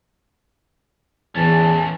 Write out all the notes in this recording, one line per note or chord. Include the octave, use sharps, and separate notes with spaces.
E2 E3 C#4 A5